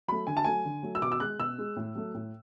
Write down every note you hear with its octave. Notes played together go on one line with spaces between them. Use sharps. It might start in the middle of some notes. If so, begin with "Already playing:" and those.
F#3 A3 B5
D3 G#5
A5
F#3 A3 G#5
D3
F#3 A3
E6
B2 D6
E6
G#3 F#6
B2 E6
G#3
A2
F#3 A3
A2